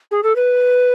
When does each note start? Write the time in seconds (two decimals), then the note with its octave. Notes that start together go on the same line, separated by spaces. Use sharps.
0.11 G#4
0.23 A4
0.36 B4